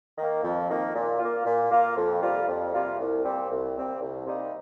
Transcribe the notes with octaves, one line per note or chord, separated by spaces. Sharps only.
D#3 A#3
F2
D#3 A#3
A#2
A#3 F4
A#2
A#3 F4
F2
C3 G3 A#3 F4
F2
C3 G3 A#3 F4
C2
A#2 G3 C4
C2
A#2 G3 C4
C2
C3 G3 A#3 D#4